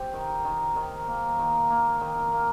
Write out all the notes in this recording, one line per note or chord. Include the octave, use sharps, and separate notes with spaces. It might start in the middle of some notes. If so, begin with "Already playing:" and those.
Already playing: C4 G4
D#3
D#3
D#3
A#3
D#3
A#3
D#3
A#3